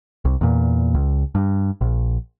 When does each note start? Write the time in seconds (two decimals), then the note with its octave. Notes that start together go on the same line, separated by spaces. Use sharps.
0.25 C2
0.41 E2 A#2
0.94 C#2
1.35 G2
1.81 A#1